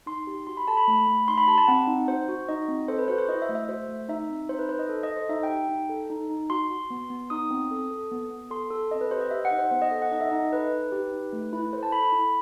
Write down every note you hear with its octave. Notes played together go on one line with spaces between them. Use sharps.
D#4 C6
G4
F#4 C6
B5
A4 A5
B5
A3
A3
D#4 C6
B5
G4 A5
A5
C4 F#5
D#4
F#4 C5
F#4
D#4 D#5
C4
A4 C5
B4
F#4 C5
C5
E4 D#5
E5
A3
E5
F#4 C5
A3
D#4 E5
C4
D#4 C5
B4
D#4 C5
D#5
A4
D#5
A4
C5
D#4 E5
G5
G4
G5
D#4
A4
D#4
D#4
F#4 C6
F#4
B3
B3
D#4 D#6
C4
A4
A4
B3
B3
A4 C6
A4
C4 D#5
B4
G4 C5
D#5
G4 E5
F#5
D#4
C5
B3 C5
D#5
A4
F#5
D#4 D#5
E5
D#4 D#5
A4 B4
D#4
G4
D#4
A3
E4
A4 C5
A5
A4 B5
B5
E4